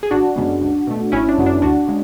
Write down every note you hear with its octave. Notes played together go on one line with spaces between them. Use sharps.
G#4
G#1 D4 F#4
F#2 C#3 G#3 B3
C#2
B2 A3
G#1 C#4 E4
D4
F#2 C#3 F#3 B3
D4
D2 D4 F#4
C#3 G#3